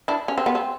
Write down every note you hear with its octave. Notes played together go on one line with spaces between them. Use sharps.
D4 E4
C#4
C4
B3
C4